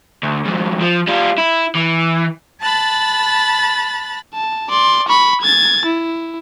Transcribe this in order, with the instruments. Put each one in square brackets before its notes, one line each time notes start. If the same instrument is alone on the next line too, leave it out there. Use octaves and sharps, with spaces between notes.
[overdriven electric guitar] D2
F2 G#2
F3
G3 F4
E4
E3
[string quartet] A5 B5 F#6 A6
[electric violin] A5
D5 C6
B5 C#6
G#6 A6
E4